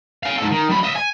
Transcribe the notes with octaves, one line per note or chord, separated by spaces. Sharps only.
F5 G#5
G#2 A4
D#3
F#2 B5
D#5 E5
G#5